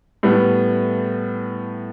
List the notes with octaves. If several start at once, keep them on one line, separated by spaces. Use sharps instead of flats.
A2 G3 B3